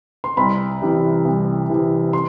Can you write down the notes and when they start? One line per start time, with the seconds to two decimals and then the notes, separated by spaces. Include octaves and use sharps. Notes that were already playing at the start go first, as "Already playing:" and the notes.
0.24 C6
0.37 C2 B5
0.82 C3 E3
1.25 C2
1.70 C3 E3
2.13 C6